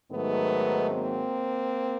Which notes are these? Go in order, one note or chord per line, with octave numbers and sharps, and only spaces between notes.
G#2 D#3 F#3 A3 B3
A#3 C4